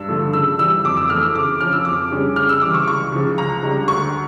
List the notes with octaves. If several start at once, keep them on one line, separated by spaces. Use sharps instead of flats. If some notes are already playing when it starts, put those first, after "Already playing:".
Already playing: G2 E6
D3 F3 A3
C#3 E6
E3 G3 E6
F2 D6
E6
E3 A3 F6
E6
C#3 D6
F3 C#4 F6
E6
F2 D6
C#3 G3 C#4
C#3 F6
E6
E3 G3 D6
C#6
C#2 C#6
C#3 F3
C#2 A#5
C#3 G3 D4
D2 C#6